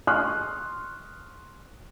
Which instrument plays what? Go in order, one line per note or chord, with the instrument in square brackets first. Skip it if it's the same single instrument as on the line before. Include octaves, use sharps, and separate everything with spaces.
[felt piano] C6 C#6 D#6 F6 F#6